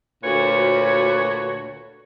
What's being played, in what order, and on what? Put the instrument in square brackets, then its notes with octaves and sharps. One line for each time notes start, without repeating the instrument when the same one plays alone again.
[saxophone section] D2 A#2 F#4 B4 C#5